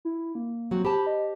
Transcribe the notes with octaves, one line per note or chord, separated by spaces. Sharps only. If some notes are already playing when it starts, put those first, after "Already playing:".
E4
A#3
F#3 C4 F#4
G4 C5 A5 B5
D#5